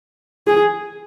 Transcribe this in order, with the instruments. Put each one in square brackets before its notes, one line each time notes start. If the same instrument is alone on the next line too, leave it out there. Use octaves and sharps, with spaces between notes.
[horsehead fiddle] G#4